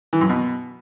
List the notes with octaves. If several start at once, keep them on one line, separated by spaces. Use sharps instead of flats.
E3
F#2
B2